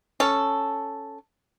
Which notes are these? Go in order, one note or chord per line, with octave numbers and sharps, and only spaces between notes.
C#4 A4